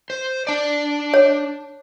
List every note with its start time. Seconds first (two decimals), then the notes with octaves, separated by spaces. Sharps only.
0.10 C5
0.47 D4 D5
1.14 C#5